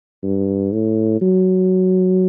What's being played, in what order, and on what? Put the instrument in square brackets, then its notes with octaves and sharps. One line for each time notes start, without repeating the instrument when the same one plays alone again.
[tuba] G2
A2
F#3